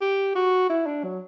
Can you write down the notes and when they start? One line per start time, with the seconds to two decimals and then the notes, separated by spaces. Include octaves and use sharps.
0.01 G4
0.35 F#4
0.70 E4
0.86 D4
1.04 F#3